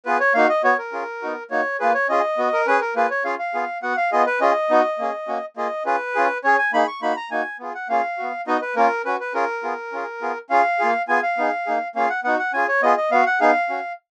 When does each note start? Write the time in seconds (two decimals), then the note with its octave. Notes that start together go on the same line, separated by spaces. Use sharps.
0.05 B3 F4 G#4 B4
0.20 C#5
0.34 A#3 D#4 F#4 F5
0.49 D#5
0.64 B3 F#4 C#5
0.78 A#4
0.92 C#4 F4 G#4
1.22 B3 D#4 F#4
1.51 A#3 D#4 F#4 C#5
1.80 A#3 F4 G#4 B4
1.94 C#5
2.09 C#4 F4 G#4 D#5
2.38 B3 F#4
2.53 A#4
2.67 C#4 G#4 B4
2.81 A#4
2.96 A#3 F4 G#4 B4
3.10 C#5
3.25 C#4 F4 G#4 F5
3.39 F5
3.54 B3 F4 G#4
3.83 B3 F#4 F#5
3.97 F5
4.12 B3 F4 G#4 D#5
4.27 B4
4.41 C#4 F4 G#4 D#5
4.70 B3 D#4 F#4
4.99 A#3 C#4 G#4
5.28 A#3 C#4 F#4
5.57 A#3 F4 G#4 D#5
5.86 C#4 F4 G#4 B4
6.15 C#4 F4 G#4
6.44 C#4 G#4 C#5
6.58 G#5
6.73 A#3 D#4 G#4 B5
6.88 C#6
7.02 A#3 D#4 F#4 B5
7.17 A#5
7.31 A#3 D#4 F#4 G#5
7.60 B3 F4 G#4
7.75 F#5
7.89 A#3 C#4 F4 G#4 F5
8.18 B3 F#4
8.47 B3 D#4 F#4 D#5
8.62 B4
8.76 A#3 C#4 F4 A#4
9.05 C#4 F#4 B4
9.20 B4
9.34 C#4 F4 G#4 A#4
9.63 B3 F4 G#4
9.92 C#4 F4 G#4
10.22 B3 F4 G#4
10.50 C#4 F4 G#4 F5
10.79 A#3 F4 G#4
11.08 B3 F4 G#4 G#5
11.23 F5
11.37 B3 D#4 G#4
11.66 A#3 D#4 G#4
11.95 A#3 C#4 F4 G#4 F5
12.10 F#5
12.24 B3 D#4 F#4 F#5
12.39 F#5
12.53 C#4 F4 G#4 G#5
12.68 C#5
12.82 B3 F4 G#4 D#5
12.97 D#5
13.11 B3 F#4 F5
13.26 F#5
13.40 B3 D#4 G#4 F5
13.69 C#4 F#4